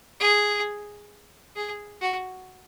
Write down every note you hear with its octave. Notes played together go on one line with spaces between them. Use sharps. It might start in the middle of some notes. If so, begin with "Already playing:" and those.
G#4
G#4
F#4